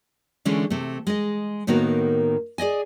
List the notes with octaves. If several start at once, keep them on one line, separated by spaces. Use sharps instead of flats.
D3 E3 G#3 A3 C#4 D4
C3 A3
G#3 D#5
A2 D#3 A#3 B3 F#4 A#4
G#4 D5 D#5 G#5